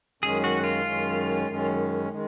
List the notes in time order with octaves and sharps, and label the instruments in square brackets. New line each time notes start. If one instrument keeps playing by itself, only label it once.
[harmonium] F#2 D#3 G#3 C#4 [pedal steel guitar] G#4
[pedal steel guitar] F#4
F4
[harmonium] F#2 D#3 G#3 C#4
F#2 D#3 G#3 C#4
D#3 G#3